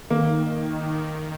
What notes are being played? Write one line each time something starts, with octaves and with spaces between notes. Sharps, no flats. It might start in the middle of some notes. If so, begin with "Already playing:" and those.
D#3 A#3